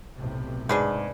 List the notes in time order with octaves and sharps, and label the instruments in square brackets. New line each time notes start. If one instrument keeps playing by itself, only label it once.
[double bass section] B1 A2 C3
[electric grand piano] G#2 [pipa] D4 G#4 B4